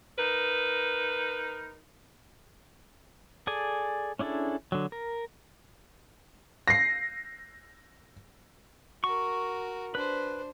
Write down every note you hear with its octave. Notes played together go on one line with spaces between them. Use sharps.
D#4 A#4 B4
G#4 A4 D5 G#5
C#4 D4 E4 G#4 A4
D3 F#3
A#4
A#6 C7
F#4 A#4 C#6
D4 B4 C5